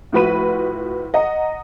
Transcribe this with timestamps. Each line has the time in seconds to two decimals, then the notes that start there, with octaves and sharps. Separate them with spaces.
0.12 A2 F3 F#4 B4 B5 D#7
1.14 D#5 F#5 A#5